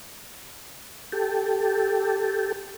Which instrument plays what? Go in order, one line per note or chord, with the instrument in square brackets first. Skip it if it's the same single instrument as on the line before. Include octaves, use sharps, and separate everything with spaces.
[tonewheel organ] G4 A4